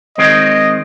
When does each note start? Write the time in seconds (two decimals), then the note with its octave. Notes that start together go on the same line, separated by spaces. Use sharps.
0.18 D#3 G#3 C4 D#5